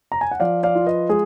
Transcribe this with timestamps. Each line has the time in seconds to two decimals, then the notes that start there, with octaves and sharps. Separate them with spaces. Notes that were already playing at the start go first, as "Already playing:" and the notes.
0.12 A#5
0.21 G#5
0.31 F#5
0.40 F3 D5 F5
0.63 D5 F5
0.75 F4
0.87 B4 D#5
1.09 G#3 G#4